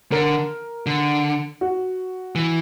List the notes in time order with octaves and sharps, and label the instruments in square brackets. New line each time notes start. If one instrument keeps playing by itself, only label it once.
[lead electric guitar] D3 [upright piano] A#4
[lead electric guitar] D3
[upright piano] F#4
[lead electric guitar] E3